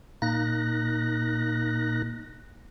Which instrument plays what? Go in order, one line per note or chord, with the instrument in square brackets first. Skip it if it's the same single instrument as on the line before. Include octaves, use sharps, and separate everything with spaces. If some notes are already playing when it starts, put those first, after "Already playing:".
[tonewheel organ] A#2 A#3 D#4 F#6 A#6